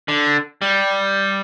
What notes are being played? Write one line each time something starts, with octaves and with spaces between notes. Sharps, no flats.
D3
G3